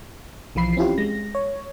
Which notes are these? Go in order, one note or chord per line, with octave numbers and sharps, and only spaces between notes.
B1 E3 F3 F4 B5 C7
C4 C#4 E4 F4 G4
G#3 A#6
C#5